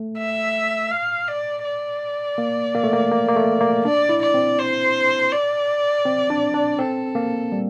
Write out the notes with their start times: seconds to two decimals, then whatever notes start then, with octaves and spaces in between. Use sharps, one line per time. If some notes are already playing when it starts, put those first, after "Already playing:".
Already playing: A3
0.18 E5
0.91 F5
1.28 D5
1.65 D5
2.38 A#3
2.75 A#3
2.84 A3
2.93 A#3
3.12 A#3
3.28 A#3
3.36 A3
3.61 A#3
3.85 D4 D5
4.09 E4
4.22 D5
4.34 C4
4.59 C5
5.32 D5
6.05 C4
6.30 D4
6.54 D4
6.79 C4 A4
7.15 A#3
7.52 G3